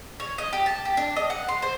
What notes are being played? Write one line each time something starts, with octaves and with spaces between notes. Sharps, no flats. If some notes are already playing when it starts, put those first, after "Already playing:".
C#5
D#5
G4
A5
G4
D4
D#5
F#5
C6
C5